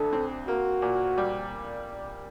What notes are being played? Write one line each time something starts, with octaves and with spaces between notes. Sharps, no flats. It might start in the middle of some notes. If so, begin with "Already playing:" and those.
Already playing: D2 D3 A4
C4
A#3 F#4
A#2
G3